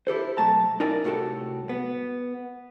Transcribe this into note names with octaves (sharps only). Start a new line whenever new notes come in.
E4 G4 A4 C5
B1 E2 A3 A5 A#5
D#4 E4 A#4 D5 G#5
C2 A2 F#4 G4 A4 A5
B3